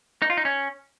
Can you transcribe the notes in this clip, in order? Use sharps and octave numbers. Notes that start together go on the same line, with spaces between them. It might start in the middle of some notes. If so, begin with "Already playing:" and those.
D#4
F4
D#4
C#4